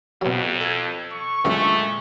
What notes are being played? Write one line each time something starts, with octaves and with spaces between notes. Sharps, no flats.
F2 B2 F#3
A4 G#6
C#6
F#2 A#2 D3 G#3 A3